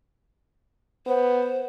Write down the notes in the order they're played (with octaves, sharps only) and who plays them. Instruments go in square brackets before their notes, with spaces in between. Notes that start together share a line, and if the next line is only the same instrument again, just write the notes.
[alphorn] B3 [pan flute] C5